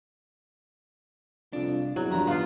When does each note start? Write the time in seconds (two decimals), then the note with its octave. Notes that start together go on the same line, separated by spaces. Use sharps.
1.53 C2 F2 D4
1.96 E2 F#3
2.11 E2 G2 F3 A#5
2.27 D#3 F3 B3 F4 F5